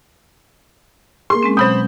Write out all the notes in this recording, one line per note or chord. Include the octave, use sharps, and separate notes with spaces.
A#3 G#4 C6
G#3 C4 C#4
B2 F#3 C5 B5 D#6 G6